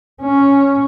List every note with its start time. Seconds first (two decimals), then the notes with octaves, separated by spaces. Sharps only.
0.22 C#4